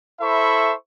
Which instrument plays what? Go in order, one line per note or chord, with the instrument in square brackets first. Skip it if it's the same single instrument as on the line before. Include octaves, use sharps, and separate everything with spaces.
[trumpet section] E4 A4 C5 E5 B5 C#6